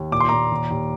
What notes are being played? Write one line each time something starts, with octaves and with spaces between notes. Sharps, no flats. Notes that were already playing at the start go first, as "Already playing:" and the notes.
Already playing: D#2
A#2 D6
C6
A#2 A#5 D6
D#2
D#2